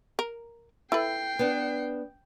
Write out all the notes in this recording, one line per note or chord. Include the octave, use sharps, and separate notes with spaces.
A#4
E4 A4 B4 G5 C7
B3 D4